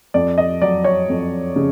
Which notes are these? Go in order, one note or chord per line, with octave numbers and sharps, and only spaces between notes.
F2 D5
D#5
F#3 D5
C#5
F2
C#3